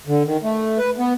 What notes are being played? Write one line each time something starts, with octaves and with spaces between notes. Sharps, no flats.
D3
D#3
A3
B4
B3